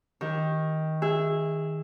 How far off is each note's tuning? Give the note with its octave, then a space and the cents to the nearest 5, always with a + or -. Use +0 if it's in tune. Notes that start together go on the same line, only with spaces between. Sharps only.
D#3 +15 G4 +0
G#4 -20 E5 +0